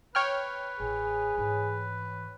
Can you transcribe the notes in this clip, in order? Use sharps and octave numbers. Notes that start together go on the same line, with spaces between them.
B4 C#5 G5 F6
A1 G#4
G#2 E3 B4